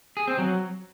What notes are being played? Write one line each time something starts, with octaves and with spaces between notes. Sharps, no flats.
G#4
C4
F#3